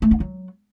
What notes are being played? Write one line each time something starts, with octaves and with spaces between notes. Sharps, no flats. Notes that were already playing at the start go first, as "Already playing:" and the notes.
A3
D#4
F#3